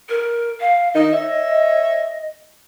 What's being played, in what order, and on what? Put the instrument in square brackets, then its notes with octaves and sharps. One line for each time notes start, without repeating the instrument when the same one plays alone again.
[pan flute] A#4
F5
[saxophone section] D#3 D#4 [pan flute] D#5
[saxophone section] C#5 E5